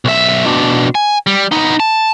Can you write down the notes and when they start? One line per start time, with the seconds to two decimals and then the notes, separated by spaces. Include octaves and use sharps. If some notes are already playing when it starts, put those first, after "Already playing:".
0.05 B1 E5
0.47 B2 D4
0.95 G#5
1.27 G3
1.52 B3 D#4
1.80 A5